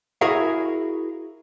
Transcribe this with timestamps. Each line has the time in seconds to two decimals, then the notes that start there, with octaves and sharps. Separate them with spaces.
0.21 E4 F#4 G#4 A#4 E5 F5